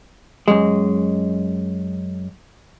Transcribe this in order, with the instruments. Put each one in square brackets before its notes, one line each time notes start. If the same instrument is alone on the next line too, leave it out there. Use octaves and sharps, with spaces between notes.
[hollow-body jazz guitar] F#2 G#3